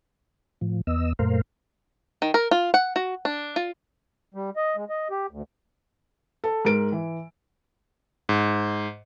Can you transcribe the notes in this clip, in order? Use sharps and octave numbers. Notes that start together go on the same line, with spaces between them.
A2 F3
E2 B3 D#5 E6
F#2 A#2 A3 A#4 C5 F5
D#3
A#4
F4
F#5
F#4
D4
F4
G3
D#5
G#3
D#5
G4
D2
A4
G#2 A#4 D7
E3
G#2